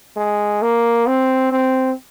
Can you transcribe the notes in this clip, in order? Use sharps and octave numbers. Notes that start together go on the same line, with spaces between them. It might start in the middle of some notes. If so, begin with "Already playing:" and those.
G#3
A#3
C4
C4